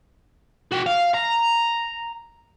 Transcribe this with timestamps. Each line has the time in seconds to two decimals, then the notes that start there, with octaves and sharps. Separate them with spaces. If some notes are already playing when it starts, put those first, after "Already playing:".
0.72 F#4 G5
0.86 F5
1.14 A#5